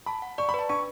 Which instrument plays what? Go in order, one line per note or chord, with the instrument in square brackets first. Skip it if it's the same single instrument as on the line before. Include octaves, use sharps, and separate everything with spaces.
[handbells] A5 [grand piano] B5
[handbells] F#5
[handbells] D5 [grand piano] C#6
[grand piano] B5
[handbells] B4 [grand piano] A5
[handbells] D4 [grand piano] C#6